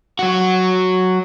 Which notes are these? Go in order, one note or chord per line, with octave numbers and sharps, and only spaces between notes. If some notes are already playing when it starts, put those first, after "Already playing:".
F#3 F#4